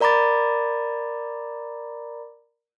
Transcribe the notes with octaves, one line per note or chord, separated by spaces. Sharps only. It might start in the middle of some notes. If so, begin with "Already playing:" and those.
A#4 D5 A#5 B5 D6 A6